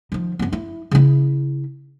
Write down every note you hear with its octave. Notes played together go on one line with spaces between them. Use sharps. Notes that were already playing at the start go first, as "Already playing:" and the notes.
D#3 F3
F#2 B3
E4
C#3 E4